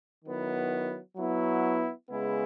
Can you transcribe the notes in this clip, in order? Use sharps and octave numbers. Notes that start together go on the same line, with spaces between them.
D#3 F#3 B3 E4
F#3 B3 E4
C#3 G#3 B3 E4